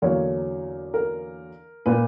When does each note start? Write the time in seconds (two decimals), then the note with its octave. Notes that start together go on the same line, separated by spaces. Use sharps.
0.02 E2 D3 F#3 A#3 A#4 C#5
0.94 A#4
1.86 A#2 A#3 B4